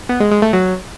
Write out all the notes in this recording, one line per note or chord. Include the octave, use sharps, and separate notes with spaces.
B3
G#3
G#3
A3
F#3